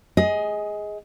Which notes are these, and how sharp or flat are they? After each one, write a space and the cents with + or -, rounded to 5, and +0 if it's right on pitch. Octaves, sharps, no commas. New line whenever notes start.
G#4 +0 D#5 +20